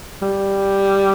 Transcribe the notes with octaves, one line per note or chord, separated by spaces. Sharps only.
G3